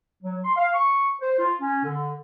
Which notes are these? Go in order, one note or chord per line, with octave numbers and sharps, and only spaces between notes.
F#3
C6
F5
C#6
C5
F4
C#4
D3